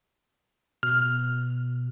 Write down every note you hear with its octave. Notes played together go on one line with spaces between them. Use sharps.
B2 F6